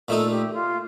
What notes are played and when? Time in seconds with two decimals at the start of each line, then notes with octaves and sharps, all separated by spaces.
0.08 A#2 A3 D#4 A4
0.30 G4
0.53 F4